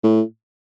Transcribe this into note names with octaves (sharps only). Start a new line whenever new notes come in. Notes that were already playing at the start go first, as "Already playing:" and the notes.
A2